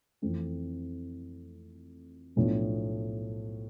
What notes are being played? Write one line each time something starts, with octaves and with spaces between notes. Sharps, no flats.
F2 E3 A3 C4
B1 A2 F3 B3 D4